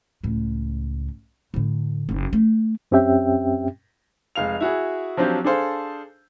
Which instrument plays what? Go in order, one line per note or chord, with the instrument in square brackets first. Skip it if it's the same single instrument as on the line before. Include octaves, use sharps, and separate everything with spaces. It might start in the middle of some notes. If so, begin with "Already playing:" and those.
[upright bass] C#2 A2
A2 D3
F#1 D#4
A3
[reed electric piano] F#2 C4 C#4 G4 E5 G5
[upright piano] F1 G#3 F5 F7
E4 F#4 G#4
F3 F#3 C4 D4 F4 G4
D4 G#4 A4 C5 F5